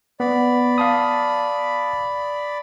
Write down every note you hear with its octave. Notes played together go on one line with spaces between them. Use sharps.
B3 D5 B5
F5 A5 D#6